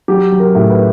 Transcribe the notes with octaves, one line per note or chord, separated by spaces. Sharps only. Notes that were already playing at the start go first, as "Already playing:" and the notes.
F#3 G4
F#3
A#4
A2
B4